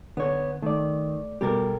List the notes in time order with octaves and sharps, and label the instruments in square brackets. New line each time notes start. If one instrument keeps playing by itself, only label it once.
[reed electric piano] D3 [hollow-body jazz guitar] B3 C#5
[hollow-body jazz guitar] D#3 [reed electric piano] A3 D5
[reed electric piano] B2 G3 [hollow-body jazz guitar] G4 A4 A#4